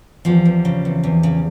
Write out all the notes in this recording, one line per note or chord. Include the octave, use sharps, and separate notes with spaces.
E2 F3 G3
E2
C#3
E2
E2
C#3